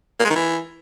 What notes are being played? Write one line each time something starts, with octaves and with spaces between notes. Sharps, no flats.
A#3
G#3
D#3
E3